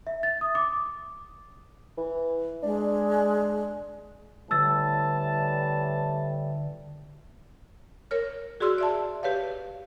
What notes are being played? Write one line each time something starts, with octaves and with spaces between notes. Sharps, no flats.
E5
A6
D#6
D6
E3
G#3 D4
A2 D3 E3 G3 A5 E6 A6
A#4 C#5 F6
F#4 G#4 D5 C6 E6 F6
D5 E5 A5
G4 B4 C#5 F5